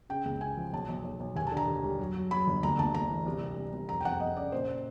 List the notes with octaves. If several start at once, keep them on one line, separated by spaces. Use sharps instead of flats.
C#3 G5
C#2
C#3 G#5
F3
B1 A5
B1
B1
B1
D#2 G#5
A5
D3
A#5
D#2
G3
F#3
F#3
F#3 B5
G1
D2 A#5
D2 A5
D2 A#5
E3
C2
G3
C2
C2
F2 A#5
G5
F2 F#5
F2 D#5
C#3 D5
A#2 C5